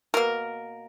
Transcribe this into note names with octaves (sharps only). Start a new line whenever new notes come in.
B2 A#3 A#4